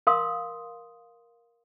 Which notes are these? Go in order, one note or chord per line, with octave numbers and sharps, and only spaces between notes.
A#4 F5 C6 D#6